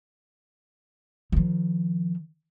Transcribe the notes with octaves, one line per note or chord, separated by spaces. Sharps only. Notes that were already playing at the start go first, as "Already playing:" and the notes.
D#3 F3